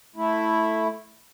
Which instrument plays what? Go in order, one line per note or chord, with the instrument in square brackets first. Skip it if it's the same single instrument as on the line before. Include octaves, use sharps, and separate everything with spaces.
[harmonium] A3 E4